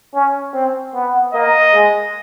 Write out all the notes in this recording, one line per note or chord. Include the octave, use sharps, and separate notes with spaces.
C#4
C4
B3
A#3 D#5
G#3